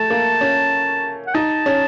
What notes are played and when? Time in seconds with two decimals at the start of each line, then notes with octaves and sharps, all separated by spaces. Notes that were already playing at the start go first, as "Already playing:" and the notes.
Already playing: A3 A5
0.10 A#3
0.41 C#4
1.27 F#5
1.34 D#4 A5
1.66 C#4